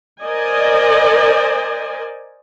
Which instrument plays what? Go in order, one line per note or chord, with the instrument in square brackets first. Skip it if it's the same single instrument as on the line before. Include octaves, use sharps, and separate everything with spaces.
[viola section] A#4 C5 D5 D#5 G#5